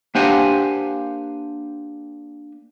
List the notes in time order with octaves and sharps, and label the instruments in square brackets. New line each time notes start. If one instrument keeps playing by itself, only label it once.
[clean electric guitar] A#3 D4 G4 C5 F#5 G#5